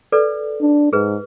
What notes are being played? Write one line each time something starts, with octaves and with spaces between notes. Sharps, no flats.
A4 B4 D5
D4
G#2 G#4 B4